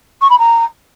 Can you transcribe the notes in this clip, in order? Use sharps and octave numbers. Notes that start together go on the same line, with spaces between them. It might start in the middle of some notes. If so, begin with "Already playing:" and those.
C#6
B5
A#5